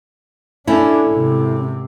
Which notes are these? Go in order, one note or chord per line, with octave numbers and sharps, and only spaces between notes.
A3 C#4 D4 E4
G#1 C3